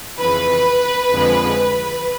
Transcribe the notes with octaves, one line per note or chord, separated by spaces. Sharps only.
F2 C#3 E3 B4
F2 D3 F3 G#3